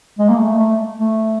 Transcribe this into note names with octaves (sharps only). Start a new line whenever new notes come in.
G#3
A#3
A3
A3
A3